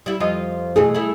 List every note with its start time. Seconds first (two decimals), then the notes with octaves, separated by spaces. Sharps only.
0.06 G3 E4
0.20 F2 F4 D#5
0.76 B2 E3 A3 G#4
0.94 A3 E4